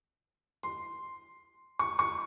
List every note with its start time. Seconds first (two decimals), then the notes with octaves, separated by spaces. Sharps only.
0.63 C6
1.79 C#6
1.99 C#6